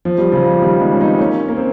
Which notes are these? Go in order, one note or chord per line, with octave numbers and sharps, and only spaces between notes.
F3
G3
C#3 F3
D#3 G3
F3 G#3
C#4
C4 D#4
A#3 C#4
A#3
C4